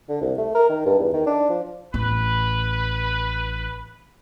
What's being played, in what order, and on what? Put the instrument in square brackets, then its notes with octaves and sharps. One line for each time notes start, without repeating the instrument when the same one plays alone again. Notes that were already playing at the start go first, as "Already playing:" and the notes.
[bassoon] D3
C2
A3
A#4
D#3
G2
E2
D#3
D4
F3
[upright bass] A1 [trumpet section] B4